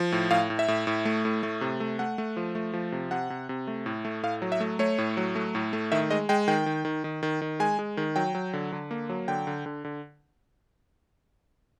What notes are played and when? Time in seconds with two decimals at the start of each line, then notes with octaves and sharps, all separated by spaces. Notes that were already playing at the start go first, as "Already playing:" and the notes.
Already playing: F3
0.12 A2
0.30 A2 F5
0.50 A2
0.59 E5
0.68 A2
0.87 A2
1.05 A3
1.25 A2
1.43 A3
1.61 C3
1.80 A3
1.99 A3 F#5
2.18 A3
2.37 F3
2.55 A3
2.73 F3
2.92 C3
3.11 C3 F#5
3.30 C3
3.49 C3
3.67 A3
3.86 A2
4.05 A3
4.23 A2 F5
4.42 F#3
4.52 E5
4.60 A3
4.79 A3 C#5
4.98 A2
5.17 F#3
5.35 A3
5.55 A2
5.73 A3
5.92 D#3 E5
6.10 G#3 D#5
6.29 G#3 G5
6.48 D#3 G5
6.66 D#3
6.85 D#3
7.04 D#3
7.23 D#3
7.42 D#3
7.60 G#3 G#5
7.79 G#3
7.97 D#3
8.16 F#3 G5
8.35 F#3
8.53 D3
8.72 D3
8.91 A#3
9.09 F#3
9.28 D3 G5
9.47 D3
9.66 D3
9.85 D3